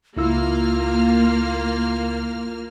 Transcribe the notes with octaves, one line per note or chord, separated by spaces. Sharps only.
C#2 A#3 E4 F4 E6 F6